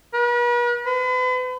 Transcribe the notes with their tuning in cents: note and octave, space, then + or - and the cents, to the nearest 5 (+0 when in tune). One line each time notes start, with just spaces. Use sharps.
B4 -40
B4 +40